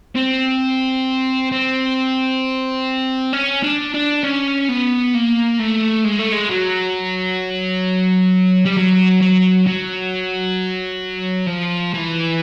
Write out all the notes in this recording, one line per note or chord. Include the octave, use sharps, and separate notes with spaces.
C4
C4
C#4
D4
D4
C#4
B3
A#3
A3
G#3
A3
G#3
F#3
G3
F#3
F#3
F#3
F3
E3